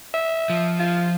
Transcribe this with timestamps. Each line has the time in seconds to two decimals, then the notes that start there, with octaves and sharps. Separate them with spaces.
0.14 E5
0.50 F3
0.79 F4